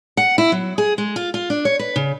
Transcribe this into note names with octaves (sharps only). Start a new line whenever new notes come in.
F#5
E4
F#3
G#4
G#3
F4
F4
D4
C#5
B4
C#3